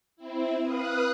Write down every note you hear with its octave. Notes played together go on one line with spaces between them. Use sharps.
C4 E4
B4 F5 D#6 F#6